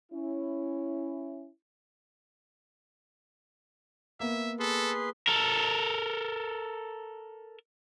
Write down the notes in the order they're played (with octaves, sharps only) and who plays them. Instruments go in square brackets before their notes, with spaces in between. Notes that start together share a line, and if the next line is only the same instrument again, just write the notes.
[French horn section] C#4 E4
[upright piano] A#3 B3 [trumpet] E5
[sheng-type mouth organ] G#4 B4 C6 [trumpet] A4
[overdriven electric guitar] A4 A#4